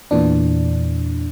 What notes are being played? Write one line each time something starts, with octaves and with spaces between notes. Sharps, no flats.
E2 A#2 E3 D4